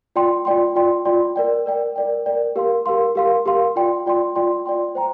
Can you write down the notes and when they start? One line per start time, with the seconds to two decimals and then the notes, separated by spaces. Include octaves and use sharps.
0.16 F4 D5 G5 C6
0.45 F4 D5 G5 C6
0.76 F4 D5 G5 C6
1.05 F4 D5 G5 C6
1.36 A#4 D5 G5
1.66 A#4 D5 G5
1.96 A#4 D5 G5
2.26 A#4 D5 G5
2.56 G4 A#4 F5 C6
2.86 G4 A#4 F5 C6
3.15 G4 A#4 F5 C6
3.46 G4 A#4 F5 C6
3.76 F4 D5 G5 C6
4.06 F4 D5 G5 C6
4.36 F4 D5 G5 C6
4.66 F4 D5 G5 C6
4.95 C5 G5 A#5